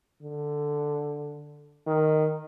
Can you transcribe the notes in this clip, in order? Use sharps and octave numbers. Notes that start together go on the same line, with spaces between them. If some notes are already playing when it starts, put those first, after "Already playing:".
D3
D#3